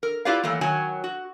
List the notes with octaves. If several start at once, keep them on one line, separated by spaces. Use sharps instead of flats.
A#4
E4 F4 G4 B4 D5 F5
E3 F#3 A3 A#3
D#3 F#3 F#4 C#5 G#5
F#4